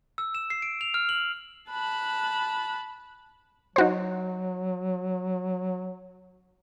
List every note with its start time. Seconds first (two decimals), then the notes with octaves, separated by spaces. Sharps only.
0.18 E6
0.35 E7
0.50 C7
0.62 D7
0.81 F7
0.94 F6
1.09 F#7
1.70 A5 B5 F#6
3.76 F#3 D#4 F#4 C5